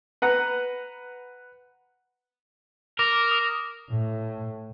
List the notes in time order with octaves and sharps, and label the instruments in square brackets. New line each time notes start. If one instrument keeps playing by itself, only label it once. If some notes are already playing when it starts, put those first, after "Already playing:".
[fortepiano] B4 F#5 A#5
[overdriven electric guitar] A#4 [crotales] D6 A#6
[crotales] D#6
[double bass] A2